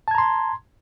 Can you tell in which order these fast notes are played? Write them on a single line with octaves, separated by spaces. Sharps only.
A5 G#6 A#5 C6